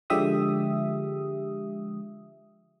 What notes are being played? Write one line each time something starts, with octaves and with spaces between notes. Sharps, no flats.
D3 F3 G#3 G4 E5 D#6